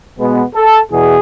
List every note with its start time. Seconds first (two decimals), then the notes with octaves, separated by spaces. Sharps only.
0.18 B2 G#3 B3
0.54 A4
0.91 E2 B2 G#4